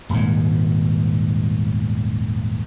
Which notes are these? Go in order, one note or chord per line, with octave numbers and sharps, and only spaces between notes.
D#1 G#1 G#2